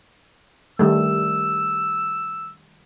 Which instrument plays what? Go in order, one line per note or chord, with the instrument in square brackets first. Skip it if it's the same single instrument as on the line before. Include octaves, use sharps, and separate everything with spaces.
[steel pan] D#3 G3 A3 [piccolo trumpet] E6